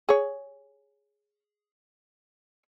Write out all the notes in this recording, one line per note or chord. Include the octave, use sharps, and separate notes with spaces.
G#4 C#5